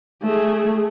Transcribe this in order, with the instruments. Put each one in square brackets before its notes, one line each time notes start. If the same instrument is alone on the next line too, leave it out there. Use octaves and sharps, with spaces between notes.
[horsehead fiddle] A3 G#4